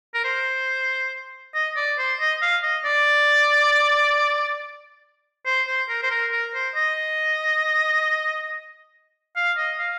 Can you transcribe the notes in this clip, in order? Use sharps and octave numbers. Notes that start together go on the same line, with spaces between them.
A#4
C5
D#5
D5
C5
D#5
F5
D#5
D5
C5
C5
A#4
C5
A#4
A#4
C5
D#5
F5
D#5
F5